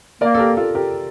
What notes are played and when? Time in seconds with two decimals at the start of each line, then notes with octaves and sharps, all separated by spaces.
0.21 A#3 A#4 D5
0.35 A4
0.39 G4 A#4
0.57 F4 A4
0.75 G4 A#4